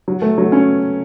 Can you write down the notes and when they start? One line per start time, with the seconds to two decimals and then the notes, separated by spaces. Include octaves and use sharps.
0.08 F#3
0.22 A3
0.38 F#3
0.52 C#4